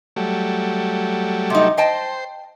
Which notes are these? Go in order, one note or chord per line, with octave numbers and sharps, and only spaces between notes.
F#3 G3 A3
C3 D#4
C5 D#5 G5 A5